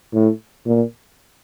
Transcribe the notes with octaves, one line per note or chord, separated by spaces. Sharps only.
A2
A#2